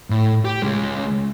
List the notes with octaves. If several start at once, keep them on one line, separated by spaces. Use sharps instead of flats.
A2
G4
C#2 G#3